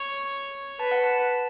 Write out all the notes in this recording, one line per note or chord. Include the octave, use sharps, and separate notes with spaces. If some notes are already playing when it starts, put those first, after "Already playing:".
Already playing: C#5
B4 A5
F#5
A5